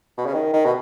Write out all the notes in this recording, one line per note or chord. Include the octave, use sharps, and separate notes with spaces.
B2
C#3
D#3
D#3
B2